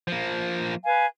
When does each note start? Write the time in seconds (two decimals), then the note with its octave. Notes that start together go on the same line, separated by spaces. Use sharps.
0.08 F3 A#3
0.85 B4 F5 G#5